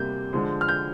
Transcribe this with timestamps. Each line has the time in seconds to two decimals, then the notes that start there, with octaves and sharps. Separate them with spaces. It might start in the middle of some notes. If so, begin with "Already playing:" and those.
Already playing: C3 G3 A#3 G6
0.33 D3 F3 G#3
0.61 F6
0.69 G6